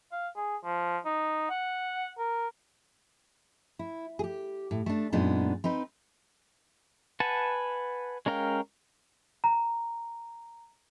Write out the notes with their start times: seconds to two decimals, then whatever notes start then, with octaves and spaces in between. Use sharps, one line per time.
0.12 F5
0.36 G#4
0.64 F3
1.05 D#4
1.50 F#5
2.18 A#4
3.79 E4
4.19 G4 G#4
4.71 A2
4.86 A3 D4
5.12 F#2 A#2 G#3 B3 D4 D#4
5.64 C4 D#4 B4
7.20 B4 F#5 G#5 A5
8.26 G#3 C#4 A#4 F5 G5
9.44 A#5